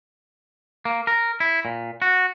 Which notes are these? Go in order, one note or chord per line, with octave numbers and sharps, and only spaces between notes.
A#3
A#4
E4
A#2
F#4